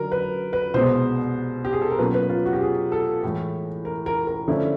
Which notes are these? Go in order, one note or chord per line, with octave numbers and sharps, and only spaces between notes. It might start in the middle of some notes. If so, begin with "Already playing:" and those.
Already playing: D3 F#3 A#4
B4
B4
C2 B2 G#3 B3 C5
G4
G#4
A4
A#4
B2 F#3 A#3 C#4 F4 B4
B4
F4
F#4
G4
G#4
A4
A2 E3 G#3
A#4
A#4
A#4
D3 F3 A3 C#4 E4